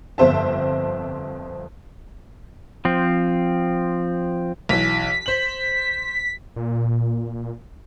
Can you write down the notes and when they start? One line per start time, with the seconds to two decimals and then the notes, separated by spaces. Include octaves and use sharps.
0.18 G1 F2 C4 C5 E5 A5
2.85 F3 C4
4.69 B1 E3 B6
5.26 C5 F#7
6.56 A#2